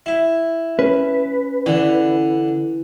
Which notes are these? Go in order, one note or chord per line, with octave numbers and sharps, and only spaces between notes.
E4
C#4 B4
D3 E3